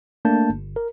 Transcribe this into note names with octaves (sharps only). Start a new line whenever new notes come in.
A3 A#3 D4 A5 G6
G1
A#4